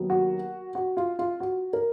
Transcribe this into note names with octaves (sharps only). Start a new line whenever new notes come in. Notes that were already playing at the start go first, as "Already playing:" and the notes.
Already playing: D#2 F#3 B3
F#4
F#4
F4
F4
F#4
A#4